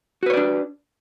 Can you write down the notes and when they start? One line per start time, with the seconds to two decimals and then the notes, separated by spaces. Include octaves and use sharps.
0.23 F#4
0.26 B4
0.30 C#5
0.34 D5
0.37 D4